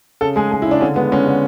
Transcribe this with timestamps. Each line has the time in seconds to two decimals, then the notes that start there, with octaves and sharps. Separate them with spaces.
0.21 C#3 A4
0.36 G#3 G#4
0.52 G#3 G#4
0.62 E4
0.67 C#3 D4
0.81 D3 C#4
0.96 G#3 B3
1.12 G#3 C#4
1.27 D3